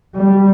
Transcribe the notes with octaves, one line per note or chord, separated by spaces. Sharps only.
G3